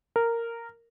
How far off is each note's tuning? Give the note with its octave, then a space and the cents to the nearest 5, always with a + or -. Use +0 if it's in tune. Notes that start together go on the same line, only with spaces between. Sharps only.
A#4 -10